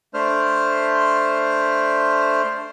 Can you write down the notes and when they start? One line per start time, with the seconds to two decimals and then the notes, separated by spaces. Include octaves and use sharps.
0.14 A3 D4 C5 F6